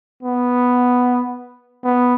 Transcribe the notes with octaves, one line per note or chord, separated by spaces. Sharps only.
B3
B3